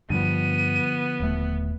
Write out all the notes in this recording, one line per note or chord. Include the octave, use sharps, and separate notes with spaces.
G2 D3 F3 B3 D#7
D#1 A3